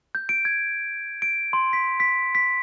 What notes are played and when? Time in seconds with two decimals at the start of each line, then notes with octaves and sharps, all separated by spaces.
0.15 G6
0.29 D7
0.45 G#6
1.22 D7
1.53 C6
1.73 B6
2.00 B6
2.35 B6